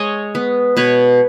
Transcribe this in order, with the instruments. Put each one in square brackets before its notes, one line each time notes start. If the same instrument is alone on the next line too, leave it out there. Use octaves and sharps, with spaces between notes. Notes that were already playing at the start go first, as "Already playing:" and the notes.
Already playing: [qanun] G#3 C#5 D#5
B3
B2 B4 C#5